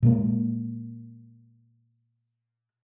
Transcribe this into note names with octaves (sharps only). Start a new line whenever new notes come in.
A#2 G#3 A#3